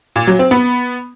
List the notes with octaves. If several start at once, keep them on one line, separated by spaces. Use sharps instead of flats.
A#2
F#3
C4
B3